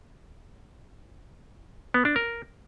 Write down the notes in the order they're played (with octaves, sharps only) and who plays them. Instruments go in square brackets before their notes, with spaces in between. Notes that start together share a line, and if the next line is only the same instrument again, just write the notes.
[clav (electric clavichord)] B3
D4
A#4